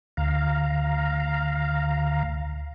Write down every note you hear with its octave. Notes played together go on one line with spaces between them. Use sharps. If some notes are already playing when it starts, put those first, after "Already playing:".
D2 F5 A#5